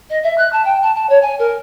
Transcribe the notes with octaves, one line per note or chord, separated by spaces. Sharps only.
D#5
E5
F#6
A5
G5
A5
A5
C#5
G#5
A#4